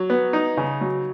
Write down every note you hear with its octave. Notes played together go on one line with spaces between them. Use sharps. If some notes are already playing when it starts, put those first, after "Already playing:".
Already playing: F#3
B3
D#4
C#3
F#3